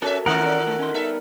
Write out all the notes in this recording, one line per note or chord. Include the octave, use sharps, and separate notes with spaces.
C#4 F#4 A4 A#4 E5
A2 D#3 C#4 F4 A4 A#4 F#5
C#4 D5
D3 A3
C#4 D#4 C6
G3 B3 D#4 A4 E5